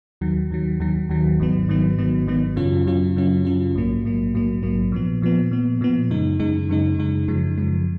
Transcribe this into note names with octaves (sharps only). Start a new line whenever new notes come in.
D#2 D#3 F#3
D#2 D#3 F#3
D#2 D#3 F#3
D#2 D#3 F#3
G#1 G#2 D#3 F#3 B3
G#1 G#2 D#3 F#3 B3
G#1 G#2 D#3 F#3 B3
G#1 G#2 D#3 F#3 B3
F#2 C#3 F#3 C#4 F4
F#2 C#3 F#3 C#4 F4
F#2 C#3 F#3 C#4 F4
F#2 C#3 F#3 C#4 F4
A#1 G#2 F#3 A#3
A#1 G#2 F#3 A#3
A#1 G#2 F#3 A#3
A#1 G#2 F#3 A#3
A#2 F3 B3
A#2 F3 B3
A#2 F3 B3
A#2 F3 B3
F#2 C#3 G#3 D#4
F#2 C#3 G#3 D#4
F#2 C#3 G#3 D#4
F#2 C#3 G#3 D#4
F#2 C#3 F3 G#3
F#2 C#3 F3 G#3